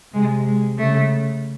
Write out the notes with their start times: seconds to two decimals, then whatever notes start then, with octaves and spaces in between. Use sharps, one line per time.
0.13 C3 G#3
0.46 G#3
0.77 C#3 A3